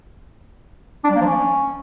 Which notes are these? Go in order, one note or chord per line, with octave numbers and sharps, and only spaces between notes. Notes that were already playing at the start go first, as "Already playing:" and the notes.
D4
G3
A#3
F3
C#4